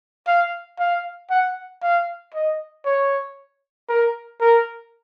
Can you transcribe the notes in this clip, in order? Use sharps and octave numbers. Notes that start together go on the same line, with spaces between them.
F5
F5
F#5
F5
D#5
C#5
A#4
A#4